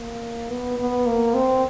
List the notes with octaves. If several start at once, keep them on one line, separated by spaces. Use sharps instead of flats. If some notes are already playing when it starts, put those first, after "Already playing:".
Already playing: A#3
B3
B3
A#3
C4